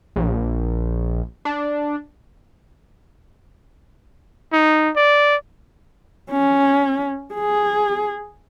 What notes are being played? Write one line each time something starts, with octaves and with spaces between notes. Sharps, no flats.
A#1
D4
D#4
D5
C#4
G#4